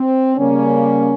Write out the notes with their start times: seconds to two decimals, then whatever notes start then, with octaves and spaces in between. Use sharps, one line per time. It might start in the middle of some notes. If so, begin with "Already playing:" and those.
Already playing: C4
0.37 C#3 G3 A#3 C#4